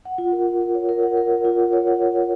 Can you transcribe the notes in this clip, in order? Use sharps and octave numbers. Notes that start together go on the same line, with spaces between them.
F#5
F4
A#4
F#5
A#4
C#5
A#4
F#5
A#4
F4
F4
F#5
C#5
F#5
C#5
A#4